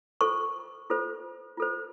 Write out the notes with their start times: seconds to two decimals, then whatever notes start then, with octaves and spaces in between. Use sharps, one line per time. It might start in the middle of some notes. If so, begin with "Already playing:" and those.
0.21 F4 A4 C5 C#6
0.90 F4 A4 C5
1.57 F4 A4 C5